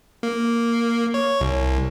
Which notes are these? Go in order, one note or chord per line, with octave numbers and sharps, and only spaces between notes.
A#3
C#5
C2